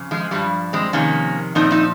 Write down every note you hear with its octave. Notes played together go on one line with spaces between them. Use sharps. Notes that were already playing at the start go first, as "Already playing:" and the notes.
Already playing: F2 C#3
F3 G#3
G2 F3 G3
G#3 C4
F2 C3 D#3 A#3 C#4
A#2 F3 C4 D#4
C4 D#4